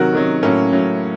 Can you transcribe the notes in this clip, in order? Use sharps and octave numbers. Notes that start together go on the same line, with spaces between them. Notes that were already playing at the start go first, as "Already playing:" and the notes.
Already playing: C3 D#3 F#3 F#4 A#4
C3 D#3 F#3
A2 F#3 A#3 C#4
A2 F#3